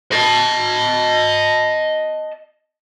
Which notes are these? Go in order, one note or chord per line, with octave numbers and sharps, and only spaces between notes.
D#5 A5